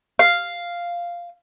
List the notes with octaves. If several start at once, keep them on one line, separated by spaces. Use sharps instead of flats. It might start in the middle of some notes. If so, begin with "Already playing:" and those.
F5